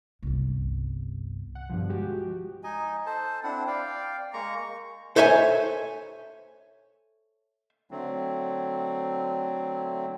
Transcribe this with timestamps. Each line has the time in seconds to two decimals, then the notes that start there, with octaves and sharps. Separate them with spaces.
0.23 G1 C2
1.55 F#5
1.70 G2 B2 D3 F3
1.89 F3 G#3 F#4 G4
2.64 D#4 D#5 G#5
3.06 A4 C5 A5
3.43 C4 D4 E4 F#5
3.67 D5 F5 G5
4.33 G#3 A#3 A#5 C#6
4.57 C#6
5.16 A4 C5 C#5 E5 F#5 G#5
7.91 D3 F#3 A3 C4